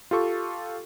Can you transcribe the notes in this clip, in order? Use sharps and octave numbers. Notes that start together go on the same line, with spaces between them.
F4 G4 A4 C#6